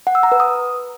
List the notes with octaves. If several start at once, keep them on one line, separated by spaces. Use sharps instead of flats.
F#5
E6
A#5
B4
D#6